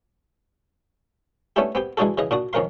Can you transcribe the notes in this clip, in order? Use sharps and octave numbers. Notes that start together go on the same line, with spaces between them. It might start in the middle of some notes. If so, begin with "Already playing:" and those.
A3 B3 C#4 D4 E4 G4
B3 C4 G4
E3 G#3 D4 D#4 F#4 A4
C#3 E3 D#5
A#2 D4 F#4 D#6
F2 D#3 C#4 A#4 F5 C6